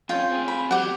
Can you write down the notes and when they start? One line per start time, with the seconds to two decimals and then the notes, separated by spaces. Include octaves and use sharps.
0.09 F2 C#4 F4 G5
0.31 C4 G#4
0.48 B5
0.71 F#3 G3 G4 F#5